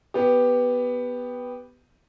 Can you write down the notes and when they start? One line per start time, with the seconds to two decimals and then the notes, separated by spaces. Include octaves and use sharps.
0.14 B3 G4